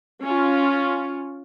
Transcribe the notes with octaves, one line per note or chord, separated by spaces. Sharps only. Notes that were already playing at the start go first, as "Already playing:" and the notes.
C#4 F4